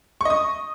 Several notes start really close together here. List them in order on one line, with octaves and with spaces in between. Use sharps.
C#6 D#5 D#6